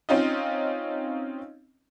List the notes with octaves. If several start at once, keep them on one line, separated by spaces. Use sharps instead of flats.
C4 C#4 D#4 F4 D#5